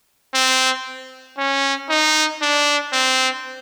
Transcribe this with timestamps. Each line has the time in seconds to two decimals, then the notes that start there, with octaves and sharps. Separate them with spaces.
0.34 C4
1.38 C#4
1.89 D#4
2.42 D4
2.93 C4